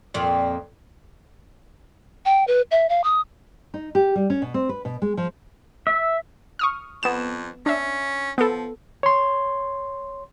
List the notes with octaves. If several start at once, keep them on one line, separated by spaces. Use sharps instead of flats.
F2 A#2
G5
B4
E5
F5
D#6
D#4
G4
G3
C#4
B2
C4
B4
B2
G#3
F3
E5
C#6 D#6 F6
F2 B3 E7
C#4 D4 E5
F3 B3 A4
C#5 C6